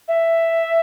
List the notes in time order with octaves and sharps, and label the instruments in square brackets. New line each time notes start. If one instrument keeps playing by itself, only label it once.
[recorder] E5